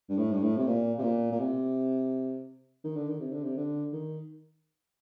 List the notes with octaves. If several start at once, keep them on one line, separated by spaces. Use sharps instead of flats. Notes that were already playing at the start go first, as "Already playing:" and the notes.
G2
A2
G2
A2
C3
A#2
C3
A#2
A#2
C3
D#3
D3
D#3
C3
D3
C3
D3
D#3